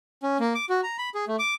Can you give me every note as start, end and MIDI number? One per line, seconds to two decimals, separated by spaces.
0.23 0.37 61
0.40 0.53 58
0.55 0.65 86
0.69 0.81 66
0.83 0.97 82
0.98 1.09 83
1.15 1.25 68
1.28 1.36 57
1.39 1.54 86